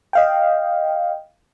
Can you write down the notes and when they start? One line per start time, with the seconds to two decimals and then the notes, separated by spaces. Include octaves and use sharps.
0.13 D#5 F5 G5